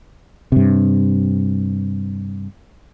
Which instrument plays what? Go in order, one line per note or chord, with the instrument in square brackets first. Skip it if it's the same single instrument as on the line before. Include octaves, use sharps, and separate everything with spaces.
[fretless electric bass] G2 C3